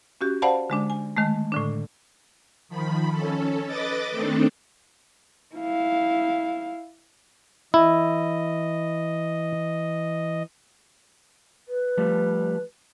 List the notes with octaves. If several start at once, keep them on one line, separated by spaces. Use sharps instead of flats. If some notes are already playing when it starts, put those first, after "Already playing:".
C#4 F#4 G4
C5 D5 F5 F#5 A5 B5
D3 G#3 D4
G#5
D#3 G#3 A3
A2 D3 D4
D#3 F3 B5
C#4 A4
B4 D#5 D6 A6
D#3 A3 C4 D4 A4
E4 F5
E3 E4 D#5
B4
F3 G3 A3